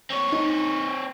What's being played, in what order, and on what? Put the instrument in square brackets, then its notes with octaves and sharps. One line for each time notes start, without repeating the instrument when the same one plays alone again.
[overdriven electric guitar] C4 C#5
[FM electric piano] D#4